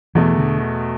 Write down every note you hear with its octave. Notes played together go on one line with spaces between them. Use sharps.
E2 B2 E3 A3
D3